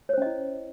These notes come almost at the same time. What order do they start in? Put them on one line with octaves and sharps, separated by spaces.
C#5 C5 C#4 D#5 E4